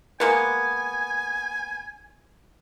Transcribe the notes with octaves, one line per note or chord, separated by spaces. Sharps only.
G#3 A#3 B3 G#5